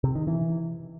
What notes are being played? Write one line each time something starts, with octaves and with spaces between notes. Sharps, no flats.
C3
D#3
E3